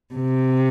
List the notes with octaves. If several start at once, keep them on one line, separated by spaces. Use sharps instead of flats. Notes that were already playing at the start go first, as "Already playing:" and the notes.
C3